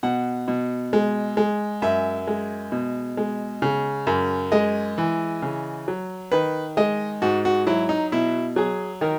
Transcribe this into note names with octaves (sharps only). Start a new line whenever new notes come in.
B2 F#5
B2
G#3
G#3
F#2 E5
G#3
B2
G#3
C#3
F#2
G#3 D#5
E3
C#3
F#3
D#3 B4
G#3 D#5
G#2 F#4
F#4
F#3 E4
D#4
B2 E4
F#3 G#4
D#3 A#4